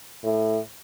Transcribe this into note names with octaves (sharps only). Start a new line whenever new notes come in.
A2